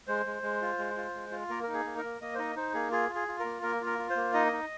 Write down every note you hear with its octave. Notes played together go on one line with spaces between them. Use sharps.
G#3 C5
G#3
G#3
F4
G#3
F4
G#3
F4
A#3 A#4
D#4 A#4
G#4
A#3
A#4
A#3
A#3 D#5
C5
D#4 D#5
D#4 C5
A#3 G#4
F4 G#4
F4
G#4
F4
A#4
A#3
A#3 A#4
F4 A#4
F4
C5
A#3
D#4 D#5
D#4